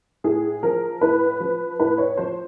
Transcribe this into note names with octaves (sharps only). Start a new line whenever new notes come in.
A2 G#4
F3 A#4
A2 B4
F3
A2 B4
C#5
F3 C5